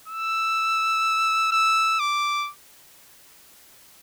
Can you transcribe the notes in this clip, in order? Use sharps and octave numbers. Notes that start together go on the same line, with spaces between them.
E6
E6
D6